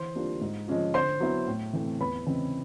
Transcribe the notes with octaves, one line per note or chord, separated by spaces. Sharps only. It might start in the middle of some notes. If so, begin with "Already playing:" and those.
Already playing: E3 C5 C6
G3 A#3 D4 F4
G#2
F3 G#3 C#4 F4
D3 C5 C6
F#3 B3 E4
A2
E3 A3 C4
E2 B4 B5
C#3 E3 G#3 C4